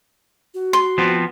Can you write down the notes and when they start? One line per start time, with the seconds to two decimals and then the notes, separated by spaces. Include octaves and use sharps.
0.54 F#4
0.73 C6
0.98 F3 B3 C4